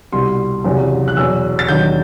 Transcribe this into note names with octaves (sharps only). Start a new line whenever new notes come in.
C2 B2 G3 C6
F#1 E2 C3 F#3
F#6
E2 B2 F#3 E6
A6
E1 D#2 D#3 F#3 G6